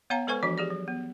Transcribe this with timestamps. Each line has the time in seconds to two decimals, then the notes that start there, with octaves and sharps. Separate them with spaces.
0.10 B3 C#5 F5 G#5 A#5
0.27 G#3 A4 B4 C5 G#5 C#6
0.43 E3 F3 D4 F#4 D#5
0.58 G4 G#4 D5
0.70 F#3
0.88 B3